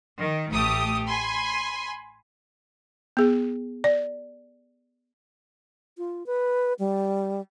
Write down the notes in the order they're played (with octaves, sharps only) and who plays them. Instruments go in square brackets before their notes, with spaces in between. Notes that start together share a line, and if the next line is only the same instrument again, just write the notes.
[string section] D#3
A1 A3 G4 D#6
G#5 B5 C6
[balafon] B3 G#4
D5
[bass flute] F4
B4
G3